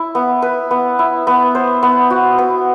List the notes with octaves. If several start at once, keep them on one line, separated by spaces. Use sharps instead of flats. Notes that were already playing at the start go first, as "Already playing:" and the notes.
Already playing: E4
B3
B4
B3
E4
B3
C5
B3
F#4
B3